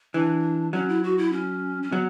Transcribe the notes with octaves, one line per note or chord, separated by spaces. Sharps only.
E3 D4
F#3 C#4
E4
F#4
E4
C#4
C#4
F#3 B3